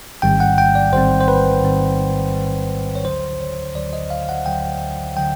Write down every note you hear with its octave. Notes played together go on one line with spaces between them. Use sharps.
A1 G#2 D#3 G3 C4 G5
F#5
G5
D5
A1 G#2 D#3 G3 C4 C5
C5
B4
A1 G#2 D#3 G3 C4
A1 G#2 D#3 G3 C4
C#5
D2 D3 F#3 C5
C#5
D2 D3 F#3 D5
D#5
F5
F#5
D2 D3 F#3 G5
D3 F#3 G5